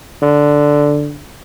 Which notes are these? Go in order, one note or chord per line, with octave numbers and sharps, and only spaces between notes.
D3